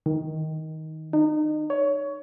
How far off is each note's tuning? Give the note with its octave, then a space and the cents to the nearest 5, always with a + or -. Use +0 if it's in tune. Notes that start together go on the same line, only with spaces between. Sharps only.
D#3 +15
D#4 -30
C#5 +20